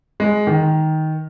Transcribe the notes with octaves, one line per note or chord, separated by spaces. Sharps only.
G#3
D#3